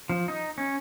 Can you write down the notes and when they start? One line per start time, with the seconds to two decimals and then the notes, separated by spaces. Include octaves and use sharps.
0.10 F3
0.28 D#4
0.58 C#4